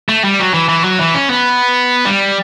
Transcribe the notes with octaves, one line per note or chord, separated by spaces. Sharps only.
A3
G3
F#3
E3
E3
F#3
E3
C#4
B3
G3